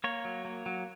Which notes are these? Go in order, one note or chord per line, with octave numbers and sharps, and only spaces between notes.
A#3 C#5
F#3
A#3
F#3